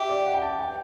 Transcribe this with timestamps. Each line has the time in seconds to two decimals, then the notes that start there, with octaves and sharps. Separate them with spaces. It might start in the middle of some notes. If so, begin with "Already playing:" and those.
Already playing: G4 E5
0.09 D5
0.26 F#5
0.34 G5
0.42 A5
0.59 G5